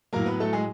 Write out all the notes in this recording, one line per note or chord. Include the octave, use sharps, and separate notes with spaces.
A2 F#3 A#3 A#4
B3 B4
A3 A4
G#3 G#4